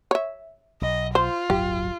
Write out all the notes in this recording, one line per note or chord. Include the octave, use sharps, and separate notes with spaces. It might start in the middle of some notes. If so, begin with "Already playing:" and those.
C#5 E5
B1 D#5
F4 C5
D1 G1 F#3 G4